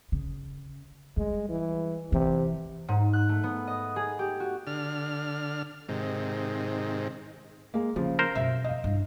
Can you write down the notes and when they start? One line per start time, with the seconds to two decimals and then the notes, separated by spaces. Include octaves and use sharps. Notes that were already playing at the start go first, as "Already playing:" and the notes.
0.12 C#3
1.17 G3 G#3
1.49 E3
2.12 C3 E3
2.88 G#2
3.13 F#6
3.29 A3
3.43 B3
3.67 D#5
3.96 G#4
4.19 G4
4.40 F#4
4.67 D3 F6
5.89 G#2 C3 D#3
7.74 G#3 A#3
7.96 C#3 F3 A#3
8.19 A#4 C5
8.35 F#2 B2 E5
8.64 D#5 F5
8.84 G2 E4